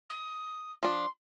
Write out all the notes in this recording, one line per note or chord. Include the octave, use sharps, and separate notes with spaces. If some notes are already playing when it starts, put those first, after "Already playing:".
D#6
F3 D4 C6